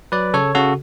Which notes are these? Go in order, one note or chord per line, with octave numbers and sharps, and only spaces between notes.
F#3 B4 D5
C#3 A4 C#5
C#3 F#4 A4